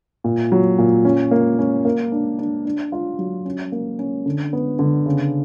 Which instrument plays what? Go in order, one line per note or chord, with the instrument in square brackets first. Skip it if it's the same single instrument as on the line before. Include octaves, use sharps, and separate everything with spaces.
[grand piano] A#2
F#3
A#2
C#4
A#3
C#4
A#3
D4
D4
D4
F4
F#3
C#4
A#3
C#4
D3
B3
D3
C#3